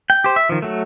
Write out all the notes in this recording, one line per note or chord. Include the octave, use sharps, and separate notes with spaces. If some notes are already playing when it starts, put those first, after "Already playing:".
G5
G4 C5
E5
D#3 F3
F#3 A3